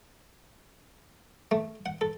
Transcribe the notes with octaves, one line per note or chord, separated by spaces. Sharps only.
A3
F#5
A4